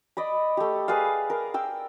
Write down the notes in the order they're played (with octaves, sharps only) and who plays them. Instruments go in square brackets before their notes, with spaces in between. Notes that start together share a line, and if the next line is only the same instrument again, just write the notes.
[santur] D5 D#5 B5
A3 G4
G#4 B4 D5 F5
A#4
G5 E6